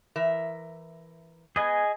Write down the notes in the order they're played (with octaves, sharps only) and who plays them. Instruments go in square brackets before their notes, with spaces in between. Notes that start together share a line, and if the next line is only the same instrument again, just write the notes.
[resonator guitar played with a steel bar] E3 A#4 E5
[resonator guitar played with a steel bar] B3 [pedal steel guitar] G#4 D#5 G#5